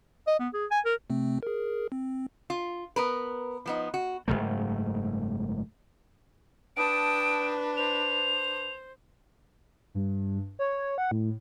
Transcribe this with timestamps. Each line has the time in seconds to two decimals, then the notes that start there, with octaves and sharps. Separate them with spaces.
0.27 D#5
0.40 B3
0.54 G#4
0.71 G#5
0.85 A#4
1.10 C3 A3 C4
1.43 G#4 A#4
1.92 C4
2.50 F4
2.96 B3 A#4 B4
3.66 F3 B3 D#4
3.94 F#4
4.28 F#1 F2 G#2 A3
6.77 D4 B4 G5 A5 D#6 D7
7.77 C5 F7
9.95 G2
10.59 C#5
10.98 F#5
11.11 A2